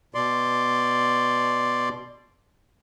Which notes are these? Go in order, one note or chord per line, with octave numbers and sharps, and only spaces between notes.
B2 D5 C6